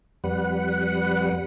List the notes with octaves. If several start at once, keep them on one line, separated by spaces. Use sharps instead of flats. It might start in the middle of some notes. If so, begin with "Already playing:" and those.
F2 G3 B4 F#5